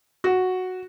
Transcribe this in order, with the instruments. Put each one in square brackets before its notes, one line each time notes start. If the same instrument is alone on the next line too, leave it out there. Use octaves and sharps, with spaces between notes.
[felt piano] F#4